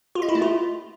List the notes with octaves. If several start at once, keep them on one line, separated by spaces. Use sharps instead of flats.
F4
D#5
E4
A3
F4